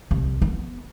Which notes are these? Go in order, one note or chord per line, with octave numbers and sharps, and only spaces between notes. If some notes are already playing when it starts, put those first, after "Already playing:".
C2
B3